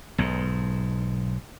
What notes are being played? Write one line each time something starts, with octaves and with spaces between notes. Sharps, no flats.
B1 G#2